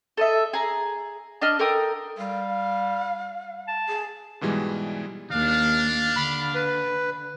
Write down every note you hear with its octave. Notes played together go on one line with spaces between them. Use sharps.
A4 D#5 E5
G#4 A#5
D4 D#5 F6
A4 A#4 G5 D#6
G3 F5
A5
G#4
G#2 B2 E3 G3 G#3
D#2 D4 F5
D3 B5
B4